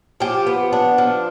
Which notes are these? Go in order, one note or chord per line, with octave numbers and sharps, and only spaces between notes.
F3 G4
B3
D4
F3